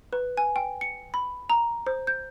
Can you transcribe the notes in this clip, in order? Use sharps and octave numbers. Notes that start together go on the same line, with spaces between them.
B4
G#5
G5
C#7
B5
A#5
C5
G6